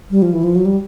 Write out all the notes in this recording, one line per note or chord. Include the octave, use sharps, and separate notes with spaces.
G3
F3
E3
F3
F#3
G3